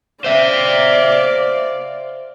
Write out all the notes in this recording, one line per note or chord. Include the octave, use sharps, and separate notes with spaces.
C5 D5 E5 F5